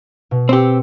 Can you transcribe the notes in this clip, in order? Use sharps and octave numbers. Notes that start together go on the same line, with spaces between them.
B2
C4 G4 E6 C#7